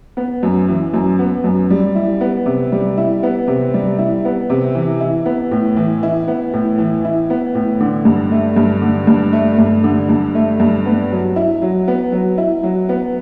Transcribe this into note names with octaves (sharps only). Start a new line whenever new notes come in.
B3
F#2
E3
F#2
B3
F#2
G3
E4
B3
C3
G3
E4
B3
C3
G3
E4
B3
C3
E3
E4
B3
A2
E3
E4
B3
A2
E3
E4
B3
A2
D3
G2
A3
G2
D3
G2
A3
G2
D3
G2
A3
G2
B3
F#3
E4
F#3
B3
F#3
E4
F#3
B3